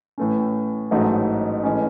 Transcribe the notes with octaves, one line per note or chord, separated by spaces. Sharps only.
A2 E3 A3 C#4
A1 G#2 F#3 A3 D#4
A2 E3 G#3 C#4